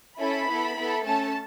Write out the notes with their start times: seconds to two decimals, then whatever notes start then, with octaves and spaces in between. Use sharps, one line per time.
0.18 C#4 E4 A4 B5
0.47 B3 E4 A4
0.76 B3 E4 A4
1.05 A3 C#4 A4 A5